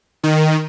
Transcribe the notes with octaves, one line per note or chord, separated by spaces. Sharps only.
D#3